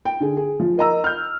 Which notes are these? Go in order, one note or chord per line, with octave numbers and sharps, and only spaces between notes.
G5
D3 G#4
G#4
F3
A#4 D#5 A#5 E6
F6 G6